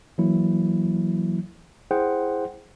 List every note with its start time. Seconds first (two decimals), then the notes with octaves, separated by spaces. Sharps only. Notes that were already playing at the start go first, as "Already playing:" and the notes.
0.18 E3 F#3 A#3 E4
1.91 E4 G#4 C5 F#5 G5